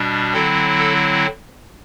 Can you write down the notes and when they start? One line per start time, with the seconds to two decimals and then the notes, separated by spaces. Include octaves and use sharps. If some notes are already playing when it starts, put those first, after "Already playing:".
Already playing: B2 G3 D4
0.33 D3 F#3 C4 E4 A4
0.79 A4